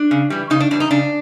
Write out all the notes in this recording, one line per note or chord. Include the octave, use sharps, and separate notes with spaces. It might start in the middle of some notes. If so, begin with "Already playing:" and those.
Already playing: D4
C#3
E3 G3
C#3 D#4
D4
E3 G3 D4
D#4
C#3 D4